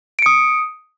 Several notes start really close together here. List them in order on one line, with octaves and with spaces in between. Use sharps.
D7 C#7 D#6